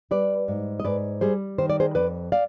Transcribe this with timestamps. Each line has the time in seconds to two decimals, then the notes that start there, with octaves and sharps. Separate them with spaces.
0.11 G3 B4 D5
0.48 G#2
0.80 D#5
0.85 G#2 B4 D5
1.21 G3 G#4 C5
1.58 D#3 C5
1.70 D5
1.80 G#4 C5
1.95 F2 B4 D5
2.32 D5 F5